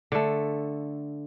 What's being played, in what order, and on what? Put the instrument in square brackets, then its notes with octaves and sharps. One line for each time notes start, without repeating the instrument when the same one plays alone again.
[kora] D3 A3